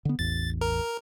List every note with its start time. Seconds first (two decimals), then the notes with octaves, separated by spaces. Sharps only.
0.05 D3 B3
0.19 A1 E2 A6
0.61 A#4